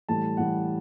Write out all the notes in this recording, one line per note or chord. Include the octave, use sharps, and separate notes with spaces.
A2 E3 G3 A5
A2 E3 G3 F#5